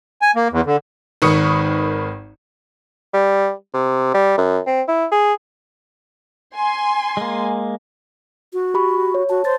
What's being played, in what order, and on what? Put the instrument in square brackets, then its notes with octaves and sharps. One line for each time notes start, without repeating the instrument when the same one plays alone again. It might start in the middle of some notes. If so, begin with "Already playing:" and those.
[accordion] G#5
A#3
E2
D3
[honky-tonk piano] G#1 D#3 B4 C#6 D#6 C#7
[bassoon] G3
C3
G3
F#2
C4
E4
G#4
[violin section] G#5 C6
[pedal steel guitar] G#3 A#3
[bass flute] F#4
[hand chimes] G4 B5 C#6
C#5
[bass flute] F#4 [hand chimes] A5
[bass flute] C5 [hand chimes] A6